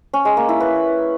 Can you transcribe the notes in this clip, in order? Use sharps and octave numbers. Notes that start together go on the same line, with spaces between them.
C#4
G#3
A#3
E4
B4